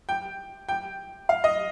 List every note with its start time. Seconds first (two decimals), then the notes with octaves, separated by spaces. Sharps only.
0.09 G5
0.69 G5
1.29 F5
1.44 D#5